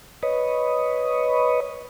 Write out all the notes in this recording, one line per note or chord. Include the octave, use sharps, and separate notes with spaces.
B4 C#5 D#5